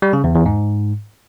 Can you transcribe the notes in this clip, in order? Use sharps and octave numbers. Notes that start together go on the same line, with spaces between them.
G3
C#3
E2
E2
G#2